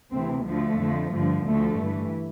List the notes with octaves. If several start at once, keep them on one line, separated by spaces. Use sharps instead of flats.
D2 C3 E3 C4
D2 D3 F3 A3
F2 D3 F3
G2 D3 F3
D2 D3 F3 A3
G2 E3